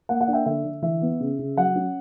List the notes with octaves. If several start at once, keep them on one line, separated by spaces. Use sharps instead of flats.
A#3 F#5
F#5
D4
E5 G5
D3 E5
D3
E3 E5
B3
C#3
C#3
F#3 F#5
C#4